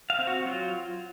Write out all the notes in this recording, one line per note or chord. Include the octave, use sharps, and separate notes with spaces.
F5
C4
F#4
F#3 F4